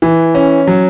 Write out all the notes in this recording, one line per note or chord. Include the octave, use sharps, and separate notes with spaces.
E3
C#4
F#3